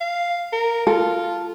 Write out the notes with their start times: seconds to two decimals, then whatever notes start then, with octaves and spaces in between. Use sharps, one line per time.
0.01 F5
0.53 A#4
0.87 F4 A4